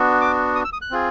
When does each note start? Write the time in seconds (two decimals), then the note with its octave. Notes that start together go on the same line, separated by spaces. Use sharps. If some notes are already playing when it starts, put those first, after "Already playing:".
Already playing: B3 D4 F#4
0.21 D6
0.56 D#6
0.65 E6
0.73 D#6
0.82 F#6
0.91 C4 F4 G#4